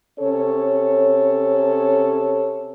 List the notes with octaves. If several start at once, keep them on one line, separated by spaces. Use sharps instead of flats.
C3 C#4 A4 C#5